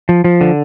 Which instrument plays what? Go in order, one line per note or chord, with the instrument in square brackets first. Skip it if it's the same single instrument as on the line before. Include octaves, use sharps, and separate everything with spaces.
[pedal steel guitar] F3
F3
D3